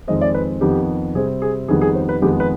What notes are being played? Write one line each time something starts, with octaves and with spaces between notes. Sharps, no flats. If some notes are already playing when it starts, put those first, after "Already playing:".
F2 D#3 G#3 C4 D#5
D5
B4
F2 D#3 B3 G4
C3 G3 C4 G#4
G#4
F2 D#3 G3 B3 G#4
G#4
C5
B4
F2 D#3 G#3 B3 G4
B4